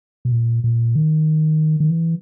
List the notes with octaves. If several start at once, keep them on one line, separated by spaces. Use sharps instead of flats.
B2
A#2
A#2
D#3
D#3
E3